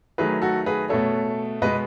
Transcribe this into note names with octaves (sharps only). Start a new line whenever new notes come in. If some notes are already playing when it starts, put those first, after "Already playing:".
D#3 F#3 A3 G#4 B4
F#4 A4
G#4 B4
B2 A3 A4 C#5
B2 G#3 B3 B4 D#5